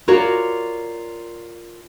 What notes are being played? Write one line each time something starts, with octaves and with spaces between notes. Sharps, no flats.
F4 F#4 A#4 C#5 D5